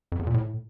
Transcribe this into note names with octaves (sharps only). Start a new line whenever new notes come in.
F2
E2
A#2
A2